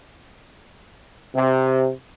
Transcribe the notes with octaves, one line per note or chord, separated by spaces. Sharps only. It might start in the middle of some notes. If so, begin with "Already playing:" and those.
C3